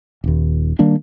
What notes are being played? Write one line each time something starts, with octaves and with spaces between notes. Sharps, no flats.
D#1 D#2
D#3 G3 A#3 D4